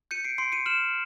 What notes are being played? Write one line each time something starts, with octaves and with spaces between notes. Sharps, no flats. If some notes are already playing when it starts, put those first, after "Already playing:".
G6 C#7 D#7
C7 D7
C6 C7 D7
C#7 D#7
F6 E7 F#7